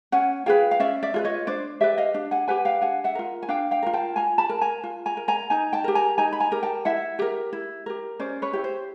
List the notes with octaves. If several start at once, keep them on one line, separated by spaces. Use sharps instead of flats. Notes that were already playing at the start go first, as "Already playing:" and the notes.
C#4 F#5 G#5
F4 G#4 B4 F5 G5
F5
C#4 D5 E5
D5 E5
F4 G#4 B4
C#5 D#5
D4 C5 D5
G4 B4 D5 E5
D#5 F5
D4
F#5 G#5
G4 B4 F#5 G#5
F5 G5
D4 F#5 G#5
E5 F#5
F4 A#4
G#5
D4 F5 G5
F5 G5
F4 A#4
G5 A5
F4 G#5 A#5
A5 B5
A#4
G#5 A#5
F4
G#5 A#5
A#4
G#5 A#5
D#4 G#5 A#5
G5 A5
G4 A#4
G#5 A#5
D#4 G#5 A#5
B5
G#5 A#5
G4 A#4
G5 A5
E4 E5 F#5
G4 A#4
E4
G4 A#4
C#4 C5 D5
B4 C#5
E4 G4
C5